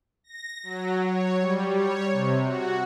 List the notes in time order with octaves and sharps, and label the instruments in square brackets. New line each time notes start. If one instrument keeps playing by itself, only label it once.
[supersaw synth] A#6
F#3
C#5
G3
C#5
C3
F#4